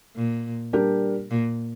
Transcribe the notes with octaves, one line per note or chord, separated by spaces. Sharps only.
A#2
G3 D4 G4 A#4
A#2